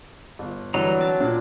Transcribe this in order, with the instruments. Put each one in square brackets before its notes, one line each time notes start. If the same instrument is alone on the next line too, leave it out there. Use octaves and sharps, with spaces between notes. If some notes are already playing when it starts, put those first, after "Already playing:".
[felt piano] G1
[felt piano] D3 E3 [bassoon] F#3 [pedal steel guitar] G3 D#4 A#5
[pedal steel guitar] C4 A5
[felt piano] A#2 D4